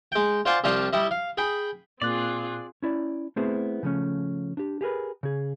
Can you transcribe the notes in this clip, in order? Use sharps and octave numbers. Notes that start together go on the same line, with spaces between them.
G#3 G5
F4 C5 D5 F5 F#5 G#5
C2 F3 D4 F5 G5 D#6
G3 E4 D#5
F5
G#4 G5 B5
A#2 A#3 C4 F4 G#4 D5 F#6
C#4 E4 D5
A3 B3 C4 E4 G#4 C5
C#3 F3 A3 C#4
D4 G4
G4 G#4 A#4 B4
C#3 G#4